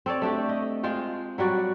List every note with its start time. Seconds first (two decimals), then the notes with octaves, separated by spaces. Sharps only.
0.06 C4 A4 C#5 D5
0.22 A3 D4 G4
0.49 D#5
0.83 G#3 F4 C5 G5
1.38 F#3 G3 F#4 D5